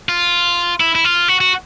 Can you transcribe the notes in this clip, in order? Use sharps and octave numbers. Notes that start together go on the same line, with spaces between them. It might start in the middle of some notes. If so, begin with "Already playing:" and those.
F4
E4
E4
F4
F#4
F#4